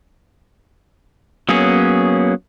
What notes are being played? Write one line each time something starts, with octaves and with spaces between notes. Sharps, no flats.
F#3 A#3 B3 C#4 G#4